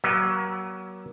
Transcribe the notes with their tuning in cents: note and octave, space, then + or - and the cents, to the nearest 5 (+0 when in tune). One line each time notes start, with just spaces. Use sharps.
F#3 +25 A#3 +40